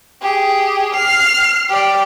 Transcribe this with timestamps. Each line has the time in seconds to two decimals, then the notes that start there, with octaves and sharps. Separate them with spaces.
0.22 G4 G#4
0.94 F6 C7
1.69 G4 D5